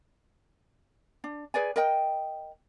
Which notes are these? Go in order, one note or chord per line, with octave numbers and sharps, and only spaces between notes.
D4
G#4 B4 D5 G#5
A#4 D#5 G5